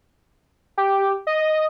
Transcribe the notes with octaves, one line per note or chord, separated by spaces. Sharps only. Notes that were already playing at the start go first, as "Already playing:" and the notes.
G4
D#5